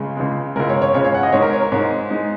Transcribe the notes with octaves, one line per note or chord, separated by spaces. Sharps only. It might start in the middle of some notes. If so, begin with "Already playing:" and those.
Already playing: C#2 C#3 G#3
C#2 C#3 G#3
C#2 C#3 G#3 A#4
C#5
C#5
C#2 C#3 G#3 C#5
C#5
F#5
D#5
G#2 G#3 D#4 C#5
A#4
C#5
A#4
G#2 G#3 D#4 C#5
G#3 D#4